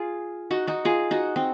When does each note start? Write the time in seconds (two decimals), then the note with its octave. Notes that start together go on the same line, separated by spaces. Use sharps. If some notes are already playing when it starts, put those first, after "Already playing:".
Already playing: F4 G#4
0.51 D#4 F#4
0.67 D#4 F#4
0.85 F4 G#4
1.11 D#4 F#4
1.36 C4 D#4